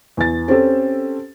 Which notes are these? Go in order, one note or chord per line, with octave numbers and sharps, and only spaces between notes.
E2 A6
C4 C#4 G4 A4